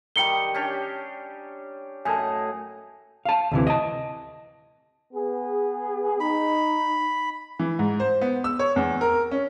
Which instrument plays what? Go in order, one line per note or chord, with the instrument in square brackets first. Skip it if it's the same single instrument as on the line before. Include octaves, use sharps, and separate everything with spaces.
[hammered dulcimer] D#3 G3 [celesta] G5 C#7 G7
[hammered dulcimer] C#4 D4 G4
[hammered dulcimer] F#2 A2 D#5 [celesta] G#5 A5
[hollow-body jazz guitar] F5 A5
D2 C3 E3
D#5 A5
[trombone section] B3 G#4
[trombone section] D#4 [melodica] B5
[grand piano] E3
G#2
C5
B3
E6
C#5
E2
A#4
C#4